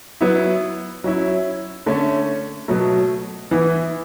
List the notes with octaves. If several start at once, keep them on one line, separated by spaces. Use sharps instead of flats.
F#3 B3 E4
F#3 C#4 E4
D3 A3 C#4
B2 F#3 A3
E3 B3 E4